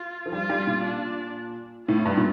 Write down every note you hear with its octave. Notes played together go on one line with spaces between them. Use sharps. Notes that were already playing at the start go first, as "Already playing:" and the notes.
Already playing: F4
F3
G3 F4
G3
A#2
D4
A2 F4
G2
A#2